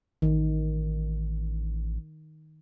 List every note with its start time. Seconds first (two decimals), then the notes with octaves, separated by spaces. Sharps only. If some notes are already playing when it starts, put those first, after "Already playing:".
0.22 A1 D#3